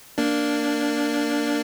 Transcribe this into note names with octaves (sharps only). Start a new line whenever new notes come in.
A#3 D4